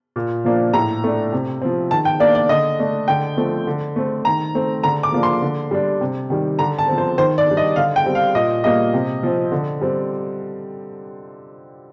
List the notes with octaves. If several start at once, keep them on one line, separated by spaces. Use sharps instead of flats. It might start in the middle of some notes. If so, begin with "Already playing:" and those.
A#2
F3 A#3 D4
A2 A#5
A3 D4
C3
F3 C4
D#3 A5
G5
A#3 D4 D5
D5
D3 D#5
A3 D4
D3 G5
F3 A3 C4
D3
A3 C4
D#3 A#5
A3 C4
D3 A#5
D6
F3 A#3 D4
C6
D3
G3 D4
C3
D#3 G3
D3 A#5
A5
F3 C4
C5
D#3 C5
D5
G3 D4
D#5
D3 F5
G5
G3 C4
F5
A#2 D#5
G3 A#3 D#5
C3
F3 C4
D3
G3 C4